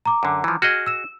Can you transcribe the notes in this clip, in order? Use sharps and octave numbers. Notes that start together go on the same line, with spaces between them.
A#5 D6
F#2 D3
E3 F3
F#4 G#4 D#5 F6 G#6
E6 E7